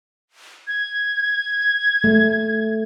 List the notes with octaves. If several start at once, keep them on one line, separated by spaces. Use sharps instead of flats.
G#6
A3